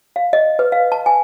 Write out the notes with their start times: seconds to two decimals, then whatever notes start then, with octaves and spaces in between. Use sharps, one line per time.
0.16 F5
0.33 D#5
0.59 B4
0.72 F5
0.92 A5
1.06 G#5